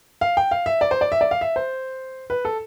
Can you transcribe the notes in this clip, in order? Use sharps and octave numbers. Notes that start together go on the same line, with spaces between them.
F5
G5
F5
E5
D5
C5
D5
E5
D5
F5
E5
C5
B4
A4